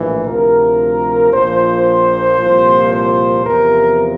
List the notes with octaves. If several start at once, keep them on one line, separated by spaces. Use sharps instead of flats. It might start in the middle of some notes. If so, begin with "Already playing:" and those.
Already playing: A#1 A2 E3
D2 C3 F3 A#4
A#1 A#2 F3 C5
C2 A#2 F3
C5
E2 C3 F3 A#4